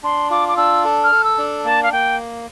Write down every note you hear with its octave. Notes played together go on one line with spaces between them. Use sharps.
D4 C6
F4 D6
D6
D4 E6
A4
F6
A4
E6
D4
A#3 A5
F5
A#3 G5